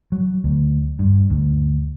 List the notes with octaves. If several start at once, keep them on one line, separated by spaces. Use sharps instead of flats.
F#3
D2
G2
D2